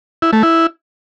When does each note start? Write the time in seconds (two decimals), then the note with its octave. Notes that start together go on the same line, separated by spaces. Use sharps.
0.22 E4
0.33 A3
0.43 E4